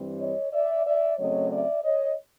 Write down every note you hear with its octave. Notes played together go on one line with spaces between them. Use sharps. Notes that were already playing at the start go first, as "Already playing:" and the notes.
Already playing: G2 E3 G3 C4
C#5 D#5
D5 E5
D5 E5
C#3 F#3 A3 C4 C#5 D#5
D5 E5
C#5 D#5